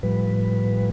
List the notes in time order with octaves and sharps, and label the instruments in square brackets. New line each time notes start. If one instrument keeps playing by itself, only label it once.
[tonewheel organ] A2 F3 G3 B4